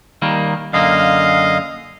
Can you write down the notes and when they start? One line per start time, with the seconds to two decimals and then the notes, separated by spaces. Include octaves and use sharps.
0.22 D#3 G3 A#3
0.73 F#2 D3 A#3 D#5 F5